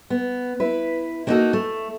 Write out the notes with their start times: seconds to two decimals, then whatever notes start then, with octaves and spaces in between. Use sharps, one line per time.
0.10 B3
0.60 E4 B4
1.27 A#3 B3 D#4 E4 F#4 A4
1.53 A3